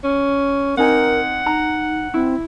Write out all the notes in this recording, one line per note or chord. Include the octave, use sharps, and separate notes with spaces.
C#4
C4 D#4 A#4 F#5 G#5
D#4 A#5
C4 E4